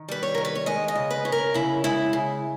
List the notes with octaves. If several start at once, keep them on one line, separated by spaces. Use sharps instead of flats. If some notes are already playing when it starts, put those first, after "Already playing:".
Already playing: D#3
G3 B4
C#5
D#3 A#4
B4
C#5
G#3 D#5
D#5
C#3
B4
C#4
A#4
C#3 E4
G#3 E4
C#3